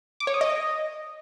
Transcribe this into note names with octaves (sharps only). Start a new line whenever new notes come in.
D6
C#5
D#6
D#5